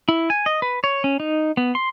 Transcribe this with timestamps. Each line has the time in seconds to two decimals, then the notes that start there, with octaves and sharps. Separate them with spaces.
0.09 E4
0.30 G#5
0.46 D#5
0.62 B4
0.84 C#5
1.04 C#4
1.20 D#4
1.57 B3
1.75 C6